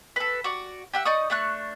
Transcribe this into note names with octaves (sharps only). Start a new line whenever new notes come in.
A4 B4
F#4 D5
G4 E5 F#5
D#4 D5 C#6 D#6
A3 D4 C#6 F#6